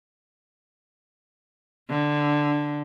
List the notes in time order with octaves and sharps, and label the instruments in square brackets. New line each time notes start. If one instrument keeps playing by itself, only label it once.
[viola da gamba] D3